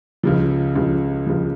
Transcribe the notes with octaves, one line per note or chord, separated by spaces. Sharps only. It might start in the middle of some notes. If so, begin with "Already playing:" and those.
C#2 C#3 F3
C#2 C#3 F3
C#2 C#3 F3